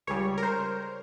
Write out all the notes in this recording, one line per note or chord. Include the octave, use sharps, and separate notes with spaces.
C#2 C#3 G3 C#5
A#4
C5